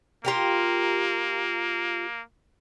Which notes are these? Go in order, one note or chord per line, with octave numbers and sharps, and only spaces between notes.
A#3 F4 G4 A#4